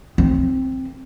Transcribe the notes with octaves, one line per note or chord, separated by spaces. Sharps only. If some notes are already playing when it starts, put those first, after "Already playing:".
C4